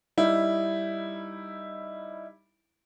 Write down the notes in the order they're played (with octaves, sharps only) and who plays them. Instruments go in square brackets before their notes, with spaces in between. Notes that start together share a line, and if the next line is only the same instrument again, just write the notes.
[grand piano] G3 D#4 E4